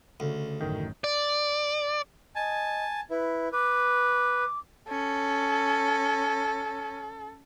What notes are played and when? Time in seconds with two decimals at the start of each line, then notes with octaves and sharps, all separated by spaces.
0.20 D2 C#3
0.61 A1 F#2 D#3
1.04 D5
2.36 D#5 G#5 A5
3.10 E4 B4
3.53 B4 D6
4.89 C#4 A4